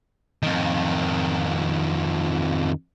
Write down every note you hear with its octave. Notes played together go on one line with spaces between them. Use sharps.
F2 D#3